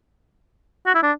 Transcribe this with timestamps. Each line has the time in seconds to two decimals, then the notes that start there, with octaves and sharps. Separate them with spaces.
0.86 F#4
0.95 E4
1.03 D4